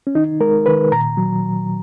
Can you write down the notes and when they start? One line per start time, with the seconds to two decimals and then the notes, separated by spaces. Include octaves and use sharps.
0.07 C#4
0.15 D#3 D#4
0.40 G#3 A#4
0.66 D#3 B4
0.92 A#2 A#5
1.17 F#3